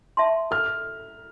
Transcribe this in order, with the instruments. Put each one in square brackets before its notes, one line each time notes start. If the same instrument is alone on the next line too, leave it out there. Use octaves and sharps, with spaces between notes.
[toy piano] E5 A5 C6
[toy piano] A4 [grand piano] F6